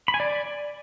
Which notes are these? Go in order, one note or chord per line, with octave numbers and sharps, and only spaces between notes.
B5
G#5
D5